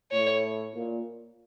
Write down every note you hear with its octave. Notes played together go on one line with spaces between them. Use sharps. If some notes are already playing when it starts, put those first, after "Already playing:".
A2 C#5
A#2